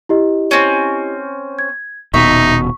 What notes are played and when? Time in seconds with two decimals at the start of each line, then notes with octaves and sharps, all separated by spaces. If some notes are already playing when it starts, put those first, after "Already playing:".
0.09 E4 G4 D#5
0.51 C4 C#4
1.59 G#6
2.14 D#1 B2 D#4 E5 C#6